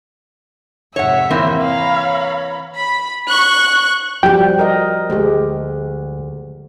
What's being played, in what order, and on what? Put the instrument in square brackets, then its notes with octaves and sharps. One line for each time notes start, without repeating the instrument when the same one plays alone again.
[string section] F2 G#2 C3 [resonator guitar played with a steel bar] C#5 F#5 [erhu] E5
[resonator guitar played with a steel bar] E3 A#3 C4
[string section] C#5 A#5 B5 [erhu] F5
[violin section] B5
C#6 F#6
[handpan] F3 G3 [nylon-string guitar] F#4 G4 [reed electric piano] G5
[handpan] A#4 D#5
[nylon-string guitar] D2 [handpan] G#3 G4